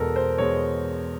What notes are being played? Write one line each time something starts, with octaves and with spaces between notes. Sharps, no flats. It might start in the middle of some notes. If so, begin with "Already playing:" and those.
Already playing: E2 B2 G#3 A4 A#4
C5
E2 B2 G#3 C#5